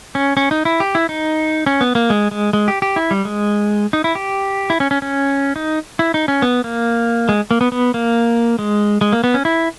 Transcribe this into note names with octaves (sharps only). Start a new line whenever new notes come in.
C#4
C#4
D#4
E4
G4
E4
D#4
C#4
B3
A#3
G#3
G#3
G#3
G4
G4
E4
G3
G#3
D#4
E4
G4
E4
C#4
C#4
C#4
D#4
E4
D#4
C#4
B3
A#3
G#3
A#3
B3
B3
A#3
G#3
G#3
A#3
B3
C#4
E4